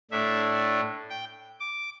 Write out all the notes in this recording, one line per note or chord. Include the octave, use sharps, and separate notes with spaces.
A2 A3 D4 E5
G5
D6